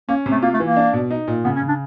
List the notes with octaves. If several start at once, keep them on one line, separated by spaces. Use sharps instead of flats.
A#3 C#4
C3
A3
A#3 F4
A3
E3
A#3
D4
B2
D#4
A#2
C#3 B3
C#4
C#3
D4